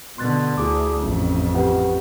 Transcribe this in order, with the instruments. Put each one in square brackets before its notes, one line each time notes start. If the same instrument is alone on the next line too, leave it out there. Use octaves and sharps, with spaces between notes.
[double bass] B2 D3 [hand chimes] C6 F#6 A6
[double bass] D2 [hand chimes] E4 G#4 D6
[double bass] A1 F2 [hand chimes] C#4
[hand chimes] G4 B4 F#5